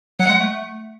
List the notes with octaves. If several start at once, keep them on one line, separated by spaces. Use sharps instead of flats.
F#3 F#5
G#3
A3